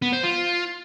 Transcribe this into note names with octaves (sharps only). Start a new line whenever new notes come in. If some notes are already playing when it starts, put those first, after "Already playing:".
B3
C5
F4